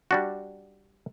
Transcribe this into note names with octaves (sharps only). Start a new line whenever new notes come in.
G3 D4 F#4